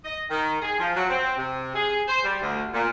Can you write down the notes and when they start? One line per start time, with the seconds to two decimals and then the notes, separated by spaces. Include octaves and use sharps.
0.04 D#5
0.30 D#3
0.62 G#4
0.79 F3
0.96 F#3
1.09 C4
1.38 C3
1.75 G#4
2.08 C5
2.24 G3
2.41 D2
2.73 A#2